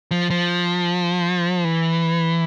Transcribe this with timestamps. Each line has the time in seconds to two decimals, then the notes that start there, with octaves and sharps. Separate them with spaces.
0.11 F3
0.30 F3
1.64 E3